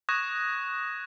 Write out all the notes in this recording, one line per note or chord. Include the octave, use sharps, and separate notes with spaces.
C#6 D#6 F#6 G#6 A#6 E7